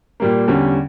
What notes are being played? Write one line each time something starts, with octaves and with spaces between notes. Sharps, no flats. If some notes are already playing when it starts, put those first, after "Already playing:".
A#2 G3 A#3
E2 D3 G3 C#4